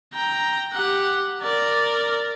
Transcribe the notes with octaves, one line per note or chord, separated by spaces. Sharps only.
G5 A#5
G4 F#5
A#4 D5